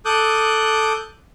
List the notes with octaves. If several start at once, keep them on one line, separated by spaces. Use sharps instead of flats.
A4 D6 D#6 F#6 G6